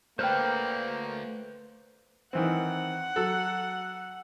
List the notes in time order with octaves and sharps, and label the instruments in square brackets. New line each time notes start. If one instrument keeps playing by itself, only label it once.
[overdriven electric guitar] A3 D5 [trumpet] A#3 [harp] B4 G5 [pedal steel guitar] C5 F6
[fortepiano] D#3 E3 C4 [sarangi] F#5
[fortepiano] F#3 A4